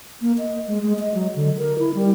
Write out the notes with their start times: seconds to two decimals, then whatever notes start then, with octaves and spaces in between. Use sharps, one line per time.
0.21 A#3
0.38 D#5
0.68 G#3
0.82 G#3
0.99 D#5
1.14 F#3
1.35 D3
1.58 A#4
1.79 E4
1.94 G3